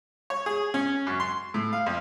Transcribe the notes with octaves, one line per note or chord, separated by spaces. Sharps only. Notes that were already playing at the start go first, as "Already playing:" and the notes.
C#5
G#4
C#4
F#2
C6
A2
F5
F2